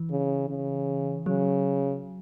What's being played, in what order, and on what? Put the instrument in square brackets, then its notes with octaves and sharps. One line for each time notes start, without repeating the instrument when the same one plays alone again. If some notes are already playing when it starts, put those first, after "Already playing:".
Already playing: [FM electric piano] E3
[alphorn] C#3
C#3
[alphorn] C#3 [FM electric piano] F#3